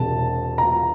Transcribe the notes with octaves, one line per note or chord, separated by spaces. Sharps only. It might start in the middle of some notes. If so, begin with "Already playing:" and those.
Already playing: E1 E2 C3 A5
A#5